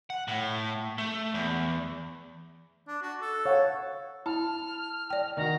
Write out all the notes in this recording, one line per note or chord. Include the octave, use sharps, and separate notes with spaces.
F#5
A2
A3
E2
D4
F#4
A4
C#5 F5 F#5
E4 A5 F6
D5 G5
D#3 F#4 A#5